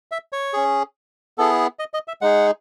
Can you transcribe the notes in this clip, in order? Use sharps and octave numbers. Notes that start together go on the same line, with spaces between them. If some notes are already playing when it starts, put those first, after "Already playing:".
E5
C#5
C#4 G#4
B3 E4 G#4 A4
D#5
D#5
E5
G#3 D#4 G#4 F#5